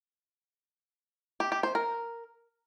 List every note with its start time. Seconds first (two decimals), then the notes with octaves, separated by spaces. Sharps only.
1.40 G4
1.52 G4
1.63 C5
1.75 A#4